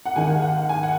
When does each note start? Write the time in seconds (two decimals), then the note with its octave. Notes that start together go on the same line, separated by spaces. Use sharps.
0.06 F#5
0.16 D#2 D#3 G#3 G#5
0.30 F#5
0.42 F#5
0.57 F#5
0.69 G#5
0.83 F#5